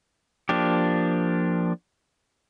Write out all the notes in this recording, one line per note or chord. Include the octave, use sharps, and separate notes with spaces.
F3 A#3 D4 G4